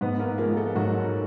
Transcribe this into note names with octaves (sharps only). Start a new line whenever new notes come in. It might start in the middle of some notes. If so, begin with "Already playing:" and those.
G#2 B3 B4
A#3 A#4
F3 G#3 A#3 A#4
A3 A4
G#2 F#3 F#4